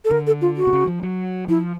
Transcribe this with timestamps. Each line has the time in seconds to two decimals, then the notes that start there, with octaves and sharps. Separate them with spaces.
0.05 A4
0.11 D3 A#4
0.27 A4
0.41 F4
0.57 F#4
0.67 C3
0.73 C#3
0.87 F3
1.03 F#3
1.48 F3 E4